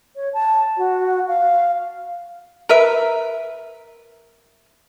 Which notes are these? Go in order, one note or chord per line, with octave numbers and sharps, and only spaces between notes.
C#5
A5
F#4
F5
A#4 B4 E5